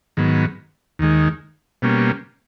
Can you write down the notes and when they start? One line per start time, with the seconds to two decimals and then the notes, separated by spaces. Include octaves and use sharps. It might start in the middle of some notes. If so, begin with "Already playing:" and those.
0.17 G#2 D#3 F#3 B3
0.99 D#2 D#3 G#3
1.82 B2 G3 A#3 C#4